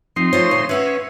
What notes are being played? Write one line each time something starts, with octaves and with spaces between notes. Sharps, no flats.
F3 C4 D#4 C6
A3 F4 C5 C#5
D2 A#2 C5
C#4 B4 C#5 E5 F#5